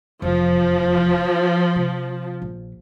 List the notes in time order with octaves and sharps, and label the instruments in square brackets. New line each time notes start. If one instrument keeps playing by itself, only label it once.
[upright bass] F1 E2 [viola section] F3
[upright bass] C3
A#1